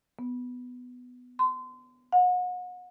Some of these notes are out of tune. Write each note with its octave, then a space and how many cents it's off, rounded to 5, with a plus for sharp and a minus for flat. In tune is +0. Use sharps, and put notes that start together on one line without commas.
B3 +5
C6 -30
F#5 -35